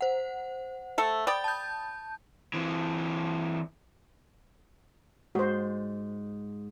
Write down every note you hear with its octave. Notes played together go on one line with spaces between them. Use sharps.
C5 F#5
A3 A4
D5 G5 B5 D#6 A6
A5 G6
E3 C4
G#2 F#4 C5